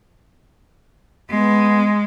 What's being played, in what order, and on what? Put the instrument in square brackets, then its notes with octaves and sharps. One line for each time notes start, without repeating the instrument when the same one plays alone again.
[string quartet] G#3 [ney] B3